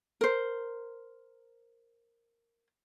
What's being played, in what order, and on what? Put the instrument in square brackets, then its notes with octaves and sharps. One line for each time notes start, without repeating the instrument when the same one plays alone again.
[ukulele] A#4 C5